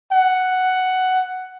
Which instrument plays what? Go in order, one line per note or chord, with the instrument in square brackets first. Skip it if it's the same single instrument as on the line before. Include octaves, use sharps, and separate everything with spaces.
[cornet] F#5